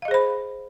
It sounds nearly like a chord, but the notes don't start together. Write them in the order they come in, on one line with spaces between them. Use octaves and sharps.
F5 D#5 G#4 C5 B5